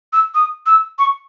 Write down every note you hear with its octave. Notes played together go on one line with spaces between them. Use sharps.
E6
D#6
E6
C#6